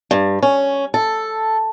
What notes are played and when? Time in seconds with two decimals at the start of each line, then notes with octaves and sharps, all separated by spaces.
0.11 G2
0.42 C#4
0.94 A4